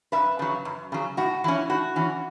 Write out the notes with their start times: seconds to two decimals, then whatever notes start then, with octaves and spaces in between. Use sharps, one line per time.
0.12 F#2 B4 E5
0.39 C#3 F#3
0.65 F#2
0.92 C#3 F#3
1.17 A2 F#4
1.44 E3 C#4 E4
1.70 A2 F#4
1.96 E3 C#4